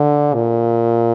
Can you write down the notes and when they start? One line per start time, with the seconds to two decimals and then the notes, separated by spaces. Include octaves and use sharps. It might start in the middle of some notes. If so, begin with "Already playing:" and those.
Already playing: D3
0.34 A#2